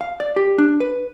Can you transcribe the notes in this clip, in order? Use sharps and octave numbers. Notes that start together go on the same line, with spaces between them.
F5
D5
G4
D4
B4